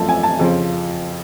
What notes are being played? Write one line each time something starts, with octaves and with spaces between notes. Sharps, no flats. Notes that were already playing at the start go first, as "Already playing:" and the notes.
Already playing: F#2 F3 A3 A5
G#5
A5
F2 C#3 F3